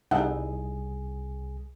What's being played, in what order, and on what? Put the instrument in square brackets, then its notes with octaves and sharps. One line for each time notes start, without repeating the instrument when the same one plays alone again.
[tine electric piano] C2 G#4 [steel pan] G3 D#4 E4 [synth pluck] A4 E5 F#5